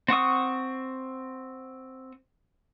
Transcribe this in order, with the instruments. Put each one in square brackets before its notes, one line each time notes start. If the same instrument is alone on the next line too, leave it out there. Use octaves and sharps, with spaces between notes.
[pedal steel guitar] C4 F#5 C#6 D#6